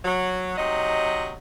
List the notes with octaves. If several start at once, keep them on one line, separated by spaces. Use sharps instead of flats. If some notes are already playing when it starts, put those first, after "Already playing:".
F#3
C3 F#3 D#4 D#5